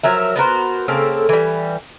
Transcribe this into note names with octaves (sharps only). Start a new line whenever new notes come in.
F3 F#3 A#4 E5
B3 F#4 A#4 C5
C#3 A#3 C4 A4
E3 G3